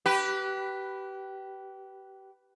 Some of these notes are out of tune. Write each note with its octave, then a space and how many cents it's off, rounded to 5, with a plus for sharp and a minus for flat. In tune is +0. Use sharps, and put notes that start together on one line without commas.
G4 -25 B4 +0